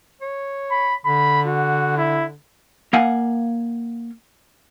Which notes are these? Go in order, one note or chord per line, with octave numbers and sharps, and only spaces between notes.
C#5
B5
D3 B5
F#4
E4
A#3 F5 F#5 G#5